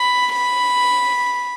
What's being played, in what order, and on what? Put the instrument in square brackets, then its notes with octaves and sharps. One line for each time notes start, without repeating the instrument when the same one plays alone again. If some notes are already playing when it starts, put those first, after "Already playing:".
Already playing: [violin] B5
B5